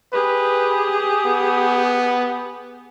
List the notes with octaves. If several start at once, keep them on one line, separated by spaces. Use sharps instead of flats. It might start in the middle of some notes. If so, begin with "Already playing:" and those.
G4 G#4 B4
B3